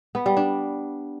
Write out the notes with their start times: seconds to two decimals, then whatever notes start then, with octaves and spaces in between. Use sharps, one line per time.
0.15 B3
0.26 G3
0.37 D4